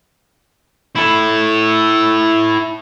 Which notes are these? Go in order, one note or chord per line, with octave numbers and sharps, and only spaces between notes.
E4 A4